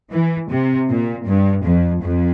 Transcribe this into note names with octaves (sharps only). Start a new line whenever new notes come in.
E3
C3
A#2
G2
F2
F2